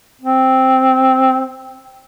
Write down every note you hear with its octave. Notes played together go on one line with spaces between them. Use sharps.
C4